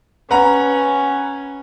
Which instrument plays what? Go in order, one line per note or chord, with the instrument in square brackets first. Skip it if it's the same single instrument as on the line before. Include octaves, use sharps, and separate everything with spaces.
[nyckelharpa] C#4 [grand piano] B4 F#5 A#5